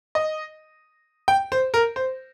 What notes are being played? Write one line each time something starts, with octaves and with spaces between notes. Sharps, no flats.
D#5
G5
C5
A#4
C5